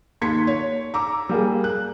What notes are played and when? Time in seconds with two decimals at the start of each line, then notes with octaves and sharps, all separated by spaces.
0.21 D#2 C6 G#6 B6 C#7
0.47 C#5
0.94 A#5 D6 E6
1.29 G3 A#3 G#4
1.64 F#6